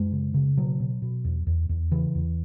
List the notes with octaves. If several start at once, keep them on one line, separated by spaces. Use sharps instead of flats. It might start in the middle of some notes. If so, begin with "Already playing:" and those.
Already playing: F#2 G#3
C#3
C#3
B2 F#3
B2
B2
E2
E2
E2
C#3 E3
E2